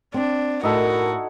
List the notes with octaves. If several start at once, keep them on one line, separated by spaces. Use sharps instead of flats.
C4 D4
A2 D#4 E4 F#4 A4 A#4